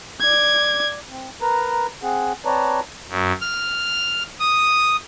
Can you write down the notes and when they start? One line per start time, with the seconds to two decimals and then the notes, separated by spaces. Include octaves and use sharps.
0.21 D5 G#6
1.09 C4
1.41 A#4 B4 A#5
2.03 C4 G#4 F#5
2.45 C4 B4 C#5 D5 A5 A#5
3.09 F#2
3.41 F6
4.39 D#6